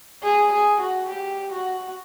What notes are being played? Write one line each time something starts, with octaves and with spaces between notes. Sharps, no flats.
G#4
G#4
F#4
G4
F#4